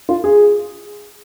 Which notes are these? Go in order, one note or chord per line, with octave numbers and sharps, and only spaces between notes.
F4
G#4